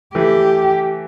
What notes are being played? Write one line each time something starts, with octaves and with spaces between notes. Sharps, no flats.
E3 A3 G4